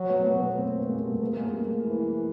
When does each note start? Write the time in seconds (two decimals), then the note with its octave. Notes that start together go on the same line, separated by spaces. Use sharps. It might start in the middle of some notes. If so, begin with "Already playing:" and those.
Already playing: F#3
0.09 A3 B3
0.25 A3 B3
0.41 A3 B3
0.57 A#3 C4
0.73 A3 B3
0.89 G#3 A#3
1.05 G3 A3
1.21 A3 B3
1.37 G#3 A#3
1.53 G3 A3
1.85 E3